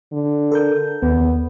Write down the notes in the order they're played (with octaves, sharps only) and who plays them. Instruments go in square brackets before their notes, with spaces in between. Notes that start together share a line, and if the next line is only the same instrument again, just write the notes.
[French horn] D3
[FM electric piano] A4 A#4 G6
[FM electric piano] D#2 [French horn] B3